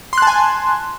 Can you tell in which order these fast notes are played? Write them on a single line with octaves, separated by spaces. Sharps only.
C6 F#6 A5 G#5